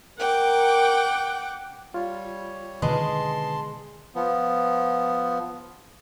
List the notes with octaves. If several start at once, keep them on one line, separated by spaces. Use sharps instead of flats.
A#4 F#5 G5 D6
G3 F4 C#5
B2 D3 D#3 G#3 B4 A5 C6 D#6
F3 B3